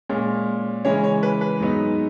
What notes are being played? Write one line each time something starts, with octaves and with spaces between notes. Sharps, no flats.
A#2 G#3 C#4
C#3 E3 G#3 C#4 C#5
C#5
B4
B4
G#2 F#3 B3 D#4